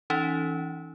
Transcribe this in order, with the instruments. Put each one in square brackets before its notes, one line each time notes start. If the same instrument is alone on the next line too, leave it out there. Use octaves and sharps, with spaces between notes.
[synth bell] E3 C#4 D#4